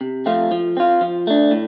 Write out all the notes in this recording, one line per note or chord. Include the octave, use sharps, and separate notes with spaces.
C3
F3 A3 C4 F4
F3
C4 F4
F3
A3 D4
A2